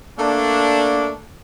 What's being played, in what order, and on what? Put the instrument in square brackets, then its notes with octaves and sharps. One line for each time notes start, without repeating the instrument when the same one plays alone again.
[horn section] A3 A#3 D4